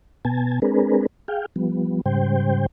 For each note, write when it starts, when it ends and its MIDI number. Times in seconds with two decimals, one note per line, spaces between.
0.25 0.60 47
0.25 0.60 59
0.25 0.60 80
0.25 0.60 81
0.62 1.06 56
0.62 1.06 60
0.62 1.06 62
0.62 1.06 68
0.62 1.06 70
0.62 1.06 71
1.28 1.46 68
1.28 1.46 77
1.28 1.46 79
1.56 2.01 53
1.56 2.01 55
1.56 2.01 59
2.06 2.66 44
2.06 2.66 49
2.06 2.66 55
2.06 2.66 72
2.06 2.66 79